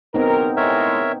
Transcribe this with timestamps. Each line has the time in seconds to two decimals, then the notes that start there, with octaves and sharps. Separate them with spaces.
0.14 F#1 F#3 B3 C4 D#4 A#4
0.57 A2 G#3 A#4 C#5 E5